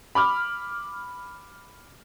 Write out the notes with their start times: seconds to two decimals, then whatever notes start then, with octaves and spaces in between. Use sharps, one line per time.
0.15 B5 D6 F6